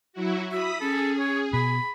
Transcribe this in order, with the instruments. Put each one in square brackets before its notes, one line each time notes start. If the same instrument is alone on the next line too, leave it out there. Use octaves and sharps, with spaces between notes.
[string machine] F#3 E4 F#4
[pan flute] F#4 [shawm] E5 [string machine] B5 D#6 B6
[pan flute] C#4 [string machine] G#4 [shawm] A4
[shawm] C#5
[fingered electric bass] B2 [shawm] B5